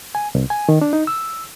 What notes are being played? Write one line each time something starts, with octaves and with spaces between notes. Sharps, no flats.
G#5
C2
G#5
D#3
D4
D#4
E6